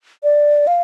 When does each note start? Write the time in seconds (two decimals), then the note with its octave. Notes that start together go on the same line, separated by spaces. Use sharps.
0.23 D5
0.67 F5